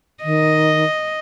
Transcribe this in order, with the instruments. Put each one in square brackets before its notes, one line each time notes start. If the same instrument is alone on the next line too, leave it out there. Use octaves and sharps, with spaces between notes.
[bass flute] D#3 [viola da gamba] D#5